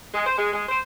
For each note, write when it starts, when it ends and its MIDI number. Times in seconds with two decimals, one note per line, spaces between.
0.14 0.24 56
0.26 0.34 72
0.38 0.52 56
0.53 0.63 56
0.68 0.78 72